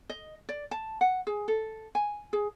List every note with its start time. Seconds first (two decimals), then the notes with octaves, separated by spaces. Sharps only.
0.10 D#5
0.49 D5
0.71 A5
1.01 F#5
1.27 G#4
1.48 A4
1.95 G#5
2.33 G#4